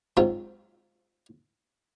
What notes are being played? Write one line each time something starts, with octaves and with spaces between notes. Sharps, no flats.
G#2 F#3 C4 F4